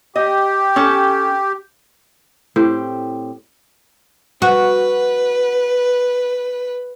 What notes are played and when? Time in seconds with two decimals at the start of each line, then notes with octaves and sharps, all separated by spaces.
0.16 G4 D#5
0.76 C#4 A4
2.56 A2 C4 G4
4.42 F#4 B4